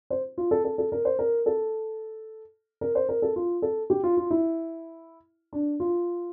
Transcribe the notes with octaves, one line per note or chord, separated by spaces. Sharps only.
C5
F4
A4
A4
A4
A#4
C5
A#4
A4
A#4
C5
A#4
A4
F4
A4
G4
F4
F4
E4
D4
F4